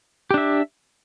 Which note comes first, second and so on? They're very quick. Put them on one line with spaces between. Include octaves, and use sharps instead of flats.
G4 D4 E5